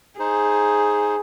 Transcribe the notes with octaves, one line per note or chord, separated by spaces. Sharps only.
D#4 G#4 C5